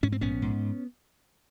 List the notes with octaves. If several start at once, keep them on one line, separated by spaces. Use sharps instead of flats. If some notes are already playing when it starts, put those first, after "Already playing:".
G#2 C#4
C4
A#1 B3 C#4
G#2